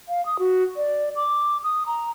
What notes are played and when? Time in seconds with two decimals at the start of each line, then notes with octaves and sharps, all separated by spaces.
0.09 F5
0.26 D#6
0.39 F#4
0.77 D5
1.16 D6
1.64 D#6
1.87 A#5